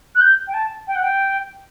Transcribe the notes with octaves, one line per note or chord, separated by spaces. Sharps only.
F#6
G6
G5
A5
G5
F#5
G5